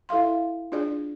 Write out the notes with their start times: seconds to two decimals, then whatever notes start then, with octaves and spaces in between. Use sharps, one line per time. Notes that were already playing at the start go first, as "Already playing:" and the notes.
0.09 E4 A4 E5 F5 C6
0.72 D4 F4 G#4 D5